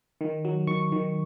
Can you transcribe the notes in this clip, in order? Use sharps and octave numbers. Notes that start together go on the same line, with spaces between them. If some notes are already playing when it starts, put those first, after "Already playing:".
D#3
F#3
D#3 C#6
D#3